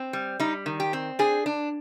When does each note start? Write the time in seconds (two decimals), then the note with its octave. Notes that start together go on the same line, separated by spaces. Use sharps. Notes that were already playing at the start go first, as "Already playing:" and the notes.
Already playing: C4
0.13 G3
0.39 G3 D#4
0.66 D#3
0.80 G4
0.93 C4
1.19 D4 G#4
1.46 D4